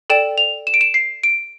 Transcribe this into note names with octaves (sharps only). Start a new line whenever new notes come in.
A4 D5 G5 E7
F7
E7
D7
E7
C7
D7